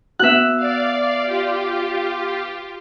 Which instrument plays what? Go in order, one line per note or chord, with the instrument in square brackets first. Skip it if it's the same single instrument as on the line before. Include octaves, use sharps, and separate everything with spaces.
[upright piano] B3 F#4 [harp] E5 F#6
[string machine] D5 F5
F4 G4